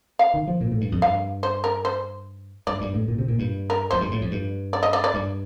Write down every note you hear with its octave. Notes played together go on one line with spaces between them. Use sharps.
F5
D#3
F3
A#2
A2
G2
F2
G2 F5
C5
A#4
C5
G2 D5
G2
A2
A#2
C3
A#2
G2
A#4
F2 C5
G2
A2
F2
G2
D5
D#5
D5
D5
G2